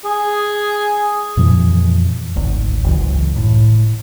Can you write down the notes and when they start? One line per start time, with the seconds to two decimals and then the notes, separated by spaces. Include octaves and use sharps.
0.05 G#4
1.37 F2 A#2 E3 F3
2.36 G#1 D2
2.84 F#1 C#2 E3
3.36 A2